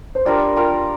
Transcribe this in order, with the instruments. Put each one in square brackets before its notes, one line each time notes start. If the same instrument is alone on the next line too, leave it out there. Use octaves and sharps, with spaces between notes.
[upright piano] C5
[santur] G3 A#3 F4 A#4 [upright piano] D4 D5
[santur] G3 A#3 F4 A#4